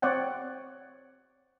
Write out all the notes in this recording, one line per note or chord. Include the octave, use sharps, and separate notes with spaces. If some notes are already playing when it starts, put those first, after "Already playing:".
C4 C#5 D5 F#5 G5